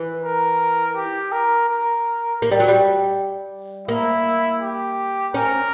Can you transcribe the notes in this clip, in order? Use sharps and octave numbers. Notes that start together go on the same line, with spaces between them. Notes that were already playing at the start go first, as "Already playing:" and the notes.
Already playing: E3
A#4
G4
A#4
A#4
A#3
G3
F#3
G3
A#3 E4
G4
C#4 A#4